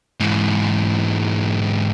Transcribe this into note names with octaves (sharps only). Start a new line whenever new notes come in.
G#2 E3